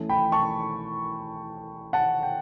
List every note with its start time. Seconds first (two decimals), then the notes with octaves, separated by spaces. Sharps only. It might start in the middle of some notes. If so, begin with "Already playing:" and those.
Already playing: E3 A3 C#4
0.09 G5 B5
0.32 A5 C#6
1.93 F#5 A5
2.23 G5